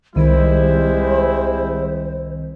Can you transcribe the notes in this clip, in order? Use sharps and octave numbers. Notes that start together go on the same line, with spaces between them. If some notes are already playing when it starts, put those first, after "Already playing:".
C2 D#3 G3 G#3 E4 C5